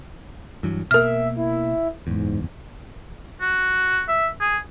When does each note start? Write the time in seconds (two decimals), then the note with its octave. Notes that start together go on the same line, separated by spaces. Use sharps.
0.63 G2 E3 F#3
0.91 B2 A#3 A#4 E5 F6
1.36 E4
2.07 F#1 E2 G#2
3.41 F#4
4.08 E5
4.40 G#4